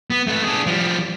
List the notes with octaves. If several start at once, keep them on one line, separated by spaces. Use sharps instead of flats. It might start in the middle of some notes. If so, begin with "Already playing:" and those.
B3
A3 B4
D4 G#4
F3 G3